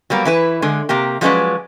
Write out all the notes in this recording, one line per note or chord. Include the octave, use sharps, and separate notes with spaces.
F#3 G3 A#3 B3
E3 E4 B4
D3 G#3
C3 A#3 G4
F3 F#3 G#3 C#4 B4 D5